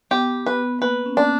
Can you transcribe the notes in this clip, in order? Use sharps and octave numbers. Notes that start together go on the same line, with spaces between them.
B3 G4
B4
A#3 B4
C#4
D4